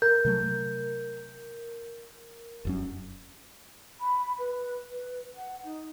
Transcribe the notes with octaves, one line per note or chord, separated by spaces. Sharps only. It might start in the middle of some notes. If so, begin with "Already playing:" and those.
A#4 G6
C3 F#3 A3
F1 F#2 C#4
B5
B4
B4
F#5
D#4